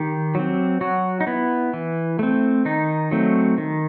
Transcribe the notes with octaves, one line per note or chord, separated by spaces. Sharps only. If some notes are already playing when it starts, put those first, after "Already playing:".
Already playing: D#3 G4
F#3 C4
F#3 F#4
D#4
B3 E4
E3
A3 C4
D#3 D#4
F#3 A3 C4
D#3